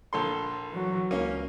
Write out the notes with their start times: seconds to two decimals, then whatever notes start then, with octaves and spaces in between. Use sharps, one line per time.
0.13 A#1 A4 C6
0.71 E3 F#3
1.11 C#2 A#3 C#4